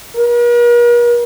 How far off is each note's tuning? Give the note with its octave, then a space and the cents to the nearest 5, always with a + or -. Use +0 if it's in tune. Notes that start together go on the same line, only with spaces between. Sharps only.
A#4 +45